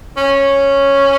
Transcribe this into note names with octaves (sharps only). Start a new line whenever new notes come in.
C#4